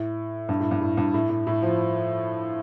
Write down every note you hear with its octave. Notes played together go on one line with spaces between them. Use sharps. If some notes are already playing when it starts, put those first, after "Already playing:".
Already playing: A2
G2
A2
G2
A2
G2
A2
A2
A2
F3